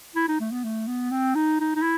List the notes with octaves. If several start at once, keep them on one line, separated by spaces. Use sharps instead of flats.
E4
D#4
A3
B3
A3
B3
C4
D#4
D#4
D#4
E4